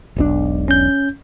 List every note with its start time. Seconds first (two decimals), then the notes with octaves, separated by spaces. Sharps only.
0.16 E1 B1 D4
0.68 C#4 G6